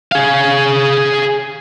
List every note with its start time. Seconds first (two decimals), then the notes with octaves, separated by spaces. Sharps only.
0.12 G#4 F5